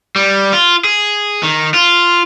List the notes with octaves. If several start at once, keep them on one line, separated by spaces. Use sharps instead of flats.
G3
F4
G#4
D#3
F4